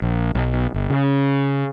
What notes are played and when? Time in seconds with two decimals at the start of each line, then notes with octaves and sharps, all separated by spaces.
0.02 A#1
0.35 B1
0.74 G1
0.90 C#3